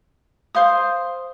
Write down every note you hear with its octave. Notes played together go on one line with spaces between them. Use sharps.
C5 F5 D#6